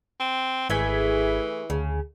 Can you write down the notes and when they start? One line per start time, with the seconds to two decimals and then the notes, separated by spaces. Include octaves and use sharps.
0.20 C4
0.70 G#1 E3 A3 E4 G#4 G#6 B6
1.70 D2 C#3